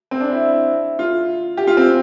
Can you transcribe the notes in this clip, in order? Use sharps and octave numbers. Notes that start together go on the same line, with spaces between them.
C4
D4
E4
F4
G4
F4
C4